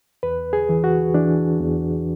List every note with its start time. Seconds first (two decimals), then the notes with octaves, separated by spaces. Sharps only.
0.23 E2 B4
0.53 G#4
0.69 E3
0.84 F#4
1.14 E3 D4
1.60 E2